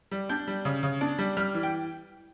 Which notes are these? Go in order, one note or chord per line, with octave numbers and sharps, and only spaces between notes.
G3
D4 G6
G3
C#3
C#3
D4
G3
G3 F6
E3
G5